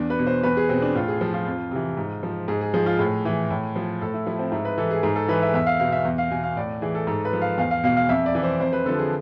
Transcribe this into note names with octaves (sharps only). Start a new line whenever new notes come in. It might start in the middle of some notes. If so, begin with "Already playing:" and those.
Already playing: E2 D4
B4
B2
C5
E2 B4
G#4
B2 C4
D4
A2 F4
G#4
F3
F4
F2
C3 E3
G#2
F3
G#2 G#4
G#4
F3 G#4
F4
A2 G#4
E3
A2
F3
A2 A4
E4
F3 E4
C4
G#2 E4
B4
E3 A4
G#4
G#2 G#4
A4
E3 B4
E5
E2 E5
F5
B2 F5
E5
E2
F5
B2 G#5
F5
A2 D5
E3 G#4
A4
G#2 A4
B4
F3
F5
E2 F5
F5
B2 F5
F5
F2 E5
D5
E3
C5
F2 C5
B4
D3 F3 A4
G#4